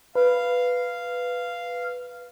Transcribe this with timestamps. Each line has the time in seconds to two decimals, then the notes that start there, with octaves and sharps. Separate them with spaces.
0.15 B4 F5